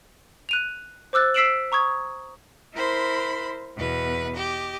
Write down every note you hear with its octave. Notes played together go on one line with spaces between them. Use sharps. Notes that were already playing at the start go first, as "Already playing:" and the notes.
F#6 D#7 F7
C5 D6 E6 F#6 A6
E6 B6 C7 D7 E7 F#7
A#5 C#6 D#6 G#6
E4 A#4 C5 B5 C6
E2 B2 B4
G4 D#5